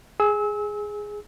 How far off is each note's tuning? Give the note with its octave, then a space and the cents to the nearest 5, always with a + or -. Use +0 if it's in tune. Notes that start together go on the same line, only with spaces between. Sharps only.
G#4 +0 E6 -30